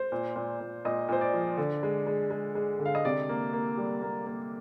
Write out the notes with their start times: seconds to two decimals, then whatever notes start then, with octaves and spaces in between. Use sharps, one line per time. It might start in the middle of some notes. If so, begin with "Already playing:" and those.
Already playing: C5
0.12 A#2
0.36 A#2
0.60 A#2
0.85 A#2 D#5
1.09 A#2 C5
1.21 D5
1.33 F3
1.57 D3
1.83 G#3
2.07 G#3
2.31 G#3
2.55 G#3
2.79 D3
2.85 F5
2.95 D#5
3.05 C3 D5
3.29 A#3
3.53 A#3
3.78 G3
4.02 A#3
4.26 A#3